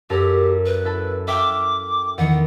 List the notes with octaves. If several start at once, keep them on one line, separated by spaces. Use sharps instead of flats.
F#2 G4 A4 A#4
B4
E4 A4
E5 G5 D6 F6
E2 D#3 F#5